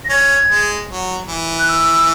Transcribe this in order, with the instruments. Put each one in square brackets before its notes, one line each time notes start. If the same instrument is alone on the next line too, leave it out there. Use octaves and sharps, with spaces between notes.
[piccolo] A#6
[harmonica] C#4 [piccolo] G#6
[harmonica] G#3
F#3
E3
[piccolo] F#6
E6